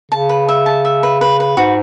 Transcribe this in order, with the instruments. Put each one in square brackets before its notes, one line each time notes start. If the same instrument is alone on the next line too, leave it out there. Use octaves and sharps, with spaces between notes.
[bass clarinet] C#3 [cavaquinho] A5
[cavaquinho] B4
E5
A5
E5
B4
B4
B4
[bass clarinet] G#2 [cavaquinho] F#4